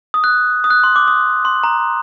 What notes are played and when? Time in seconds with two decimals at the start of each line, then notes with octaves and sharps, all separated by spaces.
0.14 D#6
0.24 F#6
0.64 D#6
0.71 F#6
0.84 C6
0.96 D6
1.08 D#6
1.45 C6
1.64 A#5